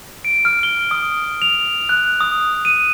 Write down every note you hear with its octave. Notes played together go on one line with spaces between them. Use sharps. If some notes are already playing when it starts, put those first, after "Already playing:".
D7
F6
G7
D#6
F7
F#6
D#6
D#7